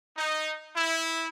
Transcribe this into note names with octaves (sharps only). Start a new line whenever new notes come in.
D#4
E4